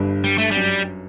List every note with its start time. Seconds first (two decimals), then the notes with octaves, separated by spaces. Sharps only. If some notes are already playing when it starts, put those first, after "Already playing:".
Already playing: G1 G2
0.24 G3
0.38 A3
0.51 F#2 G3